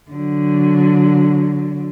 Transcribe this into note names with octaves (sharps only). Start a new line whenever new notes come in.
D3 F#3